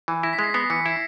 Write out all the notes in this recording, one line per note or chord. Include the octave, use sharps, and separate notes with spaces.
E3
E4 A#6
B6
G#3 C7
B3 C7
E3 C#7
E4